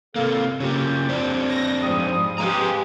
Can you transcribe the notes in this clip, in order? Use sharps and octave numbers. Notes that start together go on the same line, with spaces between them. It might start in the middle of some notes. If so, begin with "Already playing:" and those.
C3 A#3 A4 F5
C#3 A#3 F4 G4
F2 C4 D4
A#6
G#2 F3 G3 D#6
G#3 G4 B4 F5 A#5